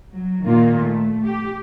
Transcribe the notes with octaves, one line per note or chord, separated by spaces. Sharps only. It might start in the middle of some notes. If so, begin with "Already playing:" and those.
F#3
A#2 D#3 A#3 F4
A3
G4